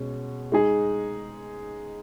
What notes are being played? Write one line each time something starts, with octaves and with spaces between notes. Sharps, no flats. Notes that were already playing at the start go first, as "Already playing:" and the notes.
Already playing: B2 G#3 C#4
G#3 D#4 G#4